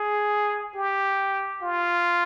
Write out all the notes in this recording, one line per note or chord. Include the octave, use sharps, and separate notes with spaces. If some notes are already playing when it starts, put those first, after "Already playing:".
Already playing: G#4
G4
F4